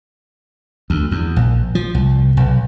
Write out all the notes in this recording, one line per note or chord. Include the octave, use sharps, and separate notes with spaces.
D2
E2
A#1
F3
C2
B1